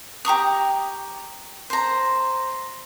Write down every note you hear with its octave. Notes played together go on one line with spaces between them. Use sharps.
G4 A#5 C#6 D#6
C5 A#5